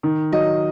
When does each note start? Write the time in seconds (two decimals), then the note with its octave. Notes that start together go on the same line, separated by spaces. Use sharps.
0.03 D#3
0.32 F#3 D#5